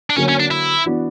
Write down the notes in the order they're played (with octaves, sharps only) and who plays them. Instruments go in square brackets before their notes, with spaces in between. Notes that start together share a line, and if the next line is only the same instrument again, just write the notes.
[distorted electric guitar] D4
[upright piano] D3 F#3 A#3 [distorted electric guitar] C#4
[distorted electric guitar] C#4
D4
E4
[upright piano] E3 B3 D4 F#4